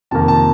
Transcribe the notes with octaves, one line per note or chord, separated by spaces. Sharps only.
F2 C3 D#3 A#3 A5
A5